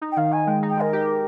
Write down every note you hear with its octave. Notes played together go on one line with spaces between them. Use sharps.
D#4
G5
D#3 F5
D#3 G#5
G#3 G5
D#4
G5
G#3 A#4
G4